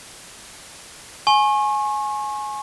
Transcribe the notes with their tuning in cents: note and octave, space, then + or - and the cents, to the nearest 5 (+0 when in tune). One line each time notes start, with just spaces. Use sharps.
G#5 +20 C#6 -35